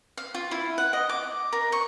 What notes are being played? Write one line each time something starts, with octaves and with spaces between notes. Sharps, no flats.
F5
F4
E4
F#5
D#5
D6
A#4
C#6